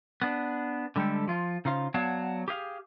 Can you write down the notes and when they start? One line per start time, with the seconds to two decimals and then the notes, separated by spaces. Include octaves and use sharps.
0.22 B3 D4
0.96 D3 G3 G#3 G4 A4
1.28 F3 F4
1.65 C#3 D#4 F4 C5 F5
1.94 F#3 B3 C#5 D5 F5 A5
2.48 G4 G#4 F5